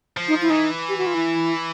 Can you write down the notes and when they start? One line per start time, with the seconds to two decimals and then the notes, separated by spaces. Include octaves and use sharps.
0.17 F3
0.28 D#4
0.42 E4
0.50 E3 D#4
0.89 G4
0.98 F#4
1.07 F4
1.14 E4